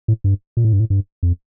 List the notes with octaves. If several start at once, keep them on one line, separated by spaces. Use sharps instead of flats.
A2
G2
A#2
A2
G2
A2
G2
F2